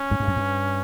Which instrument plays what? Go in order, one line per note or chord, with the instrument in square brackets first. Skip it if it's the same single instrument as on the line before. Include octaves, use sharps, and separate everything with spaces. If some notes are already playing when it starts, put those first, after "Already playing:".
Already playing: [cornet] C#4
[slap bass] G#2
G2
F2
G2